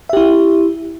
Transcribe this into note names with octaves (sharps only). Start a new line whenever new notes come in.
E4 G4 E5